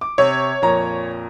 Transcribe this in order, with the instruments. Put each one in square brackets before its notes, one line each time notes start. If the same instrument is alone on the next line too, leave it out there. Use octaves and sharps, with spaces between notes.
[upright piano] D6
[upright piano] C3 [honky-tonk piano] C#5
[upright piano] F2 A#2 A#5